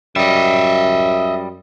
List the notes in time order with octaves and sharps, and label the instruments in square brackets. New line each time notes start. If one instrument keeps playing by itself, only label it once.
[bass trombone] F#2 [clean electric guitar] G3 [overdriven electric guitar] D#5 E5